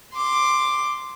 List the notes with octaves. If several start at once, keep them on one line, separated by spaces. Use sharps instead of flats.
C6 D6